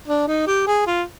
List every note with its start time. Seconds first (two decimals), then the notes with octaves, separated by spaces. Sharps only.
0.08 D4
0.28 D#4
0.47 G4
0.67 G#4
0.87 F4